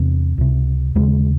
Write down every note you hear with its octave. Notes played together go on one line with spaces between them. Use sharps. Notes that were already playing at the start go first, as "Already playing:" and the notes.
Already playing: E2 C3
C#2 C3
D#2 C#3 G#3